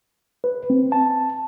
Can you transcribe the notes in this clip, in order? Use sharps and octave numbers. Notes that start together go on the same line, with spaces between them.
B4
C4
A5